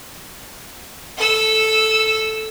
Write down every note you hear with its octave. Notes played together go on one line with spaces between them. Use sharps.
A4 E6